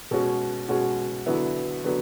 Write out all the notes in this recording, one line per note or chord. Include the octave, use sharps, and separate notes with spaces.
B2 G#3 C#4 F#4
B2 G#3 C#4 F#4
D3 F#3 B3 E4
D3 F#3 B3